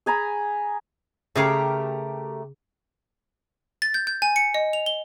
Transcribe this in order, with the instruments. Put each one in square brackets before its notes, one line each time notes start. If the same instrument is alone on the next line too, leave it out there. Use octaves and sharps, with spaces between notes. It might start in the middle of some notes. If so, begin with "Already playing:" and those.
[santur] G#4 G#5 A#5 B5
[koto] C#3 G#4 F5 [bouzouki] A3 G4 A#4
[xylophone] A6
G6
G6
G#5
C#7
D#5
F7
G7